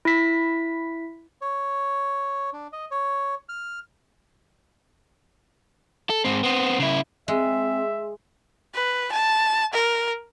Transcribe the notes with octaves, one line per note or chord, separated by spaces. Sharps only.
E4 B6
C#5
D4
D#5
C#5
F6
A4
G#2 C4
B3 C4
C#3 E4
G#3 C4 E5
B4
A5
A#4